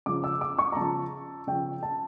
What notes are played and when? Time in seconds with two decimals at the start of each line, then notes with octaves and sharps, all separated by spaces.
0.06 C#3 F3 D6
0.24 E6
0.41 D6
0.59 C#6
0.72 A#5
0.76 C#3 F3 A5
1.47 C#3 F3 G5
1.83 A5